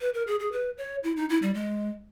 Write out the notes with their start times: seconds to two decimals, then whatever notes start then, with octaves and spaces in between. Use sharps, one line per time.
0.01 B4
0.14 A#4
0.27 G#4
0.40 G#4
0.52 B4
0.78 C#5
1.04 E4
1.17 D#4
1.29 E4
1.42 G3
1.54 G#3